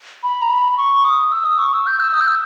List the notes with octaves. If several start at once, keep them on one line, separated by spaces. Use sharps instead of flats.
B5
A#5
B5
C#6
D#6
E6
D#6
C#6
E6
G6
E6
D#6
G6
E6